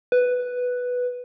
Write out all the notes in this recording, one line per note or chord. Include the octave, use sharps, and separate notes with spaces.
B4